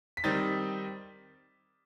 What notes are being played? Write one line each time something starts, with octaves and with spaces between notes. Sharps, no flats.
B6
D#3 G3 C4 D#4 A6